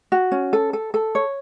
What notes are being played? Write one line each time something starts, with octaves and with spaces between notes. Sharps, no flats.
F#4
C#4
A4
A4
A4
C#5